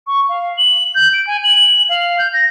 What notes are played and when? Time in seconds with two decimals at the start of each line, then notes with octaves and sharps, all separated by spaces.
0.07 C#6
0.29 F5
0.57 F#7
0.95 G6
1.13 D7
1.27 G#5
1.44 F#7
1.89 F5
2.19 G6
2.34 A#6